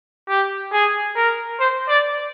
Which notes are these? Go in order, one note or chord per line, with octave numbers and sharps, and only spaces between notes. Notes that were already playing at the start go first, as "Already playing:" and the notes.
G4
G#4
A#4
C5
D5